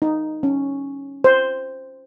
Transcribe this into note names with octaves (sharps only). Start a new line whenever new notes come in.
D#4
C#4
C5